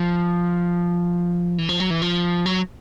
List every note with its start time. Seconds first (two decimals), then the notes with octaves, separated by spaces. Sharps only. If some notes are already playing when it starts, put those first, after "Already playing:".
Already playing: F3
1.58 E3
1.69 F3
1.80 F#3
1.90 E3
2.02 F3
2.46 F#3